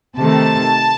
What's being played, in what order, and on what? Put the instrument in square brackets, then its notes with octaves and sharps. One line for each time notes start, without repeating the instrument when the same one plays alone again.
[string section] C3 D#3 A3 A5